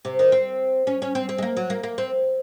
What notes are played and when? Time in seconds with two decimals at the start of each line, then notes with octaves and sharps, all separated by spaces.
0.05 C3
0.19 D#3
0.32 C4
0.87 C#4
1.02 C#4
1.15 C4
1.29 C4
1.38 G#3
1.42 A#3
1.57 F#3
1.70 A#3
1.83 A#3
1.98 C4